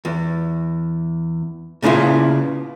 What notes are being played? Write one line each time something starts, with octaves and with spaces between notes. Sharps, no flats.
E2
A#2 C#3 B3 E4 F4